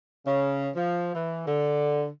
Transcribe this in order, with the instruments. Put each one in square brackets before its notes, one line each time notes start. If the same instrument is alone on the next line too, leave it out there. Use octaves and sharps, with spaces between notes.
[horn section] C#3
F3
E3
D3